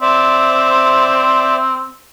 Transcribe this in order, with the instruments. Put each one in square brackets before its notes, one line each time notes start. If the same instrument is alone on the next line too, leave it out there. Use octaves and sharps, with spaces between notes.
[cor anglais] C4 [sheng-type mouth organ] C5 D5 E5